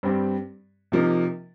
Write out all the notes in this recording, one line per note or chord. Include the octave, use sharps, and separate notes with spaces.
G2 G3 C4 G4
C3 F3 A#3 D#4